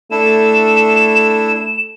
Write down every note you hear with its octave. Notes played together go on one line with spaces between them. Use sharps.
A3 D4 E4 A4 E7